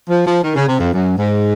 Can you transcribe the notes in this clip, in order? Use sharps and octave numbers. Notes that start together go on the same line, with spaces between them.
F3
F3
D#3
C#3
C3
F2
F#2
G#2